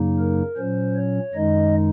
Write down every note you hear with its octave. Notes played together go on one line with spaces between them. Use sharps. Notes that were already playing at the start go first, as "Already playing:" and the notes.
Already playing: F#2 C#3 F#3 A#3 D#4
A#4
A#2 F#3 C#4 C5
C#5
F#2 D#3 G#3 D#4 D#5